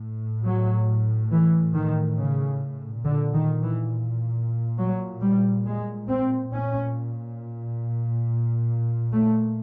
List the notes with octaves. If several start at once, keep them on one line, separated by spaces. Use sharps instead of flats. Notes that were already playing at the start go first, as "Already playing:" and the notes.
Already playing: A2
F#3
E3
D#3
C#3
A#2 D3
D#3
E3
F#3
G3
G#3
C4
A#2 C#4
A3